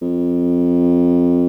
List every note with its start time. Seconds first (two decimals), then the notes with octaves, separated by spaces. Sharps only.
0.02 F2